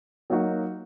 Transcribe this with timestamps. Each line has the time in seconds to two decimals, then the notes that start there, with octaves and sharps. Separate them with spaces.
0.30 F#3 A#3 D#4 F#4